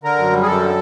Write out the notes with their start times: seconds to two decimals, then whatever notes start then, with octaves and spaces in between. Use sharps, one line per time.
0.03 D3 A#4
0.18 F#2
0.32 G3
0.42 G#4
0.47 F#2 A4
0.61 D3